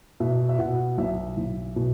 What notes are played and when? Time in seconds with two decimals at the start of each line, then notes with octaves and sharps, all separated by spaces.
0.20 B2 E5
0.49 E5
0.59 B2 F#5
0.98 B1 E5
1.37 B1
1.76 B2